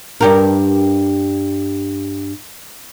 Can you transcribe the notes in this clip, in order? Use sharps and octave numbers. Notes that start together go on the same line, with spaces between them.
G2 G4 A#4